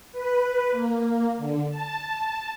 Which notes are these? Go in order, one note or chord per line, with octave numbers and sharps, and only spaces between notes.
B4
A#3
D3
A5